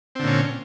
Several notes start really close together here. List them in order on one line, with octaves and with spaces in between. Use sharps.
C4 D3 A#2 C#4